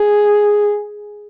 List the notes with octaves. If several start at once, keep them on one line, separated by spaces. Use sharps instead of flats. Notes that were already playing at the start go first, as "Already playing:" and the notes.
Already playing: G#4